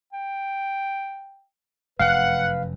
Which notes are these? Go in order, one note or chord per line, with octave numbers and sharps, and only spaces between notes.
G5
F1 F#2 B4 F5 F#5